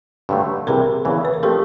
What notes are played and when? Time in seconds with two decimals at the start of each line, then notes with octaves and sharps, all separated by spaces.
0.29 G2 D3 F#3 A3
0.67 C2 C3 E3 G3 G#4 A#4
1.05 E2 C#3 E3
1.25 B4
1.34 A#4
1.43 F3 A3 C4 G4 A4